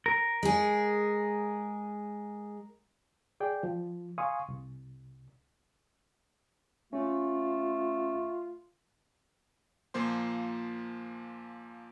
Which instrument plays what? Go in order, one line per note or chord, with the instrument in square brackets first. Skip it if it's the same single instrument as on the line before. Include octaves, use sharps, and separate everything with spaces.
[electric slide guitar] A#4
[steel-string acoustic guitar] G#3 G#4
[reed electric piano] G#4 D5 G5
F3
F5 G#5 C6 C#6 D#6
C2
[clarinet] A3 [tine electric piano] C#4 [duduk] F4
[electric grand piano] A#2 F3 A#3 C5 C6